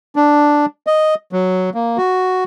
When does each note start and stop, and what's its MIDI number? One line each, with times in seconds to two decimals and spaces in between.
0.16 0.66 62
0.87 1.15 75
1.32 1.70 54
1.74 1.97 58
1.98 2.44 66